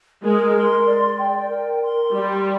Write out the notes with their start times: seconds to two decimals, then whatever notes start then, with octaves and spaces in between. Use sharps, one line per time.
0.24 G#3 A#4
0.56 C6
0.87 D5
1.18 G5
1.51 A#4
1.83 C6
2.14 G3 D5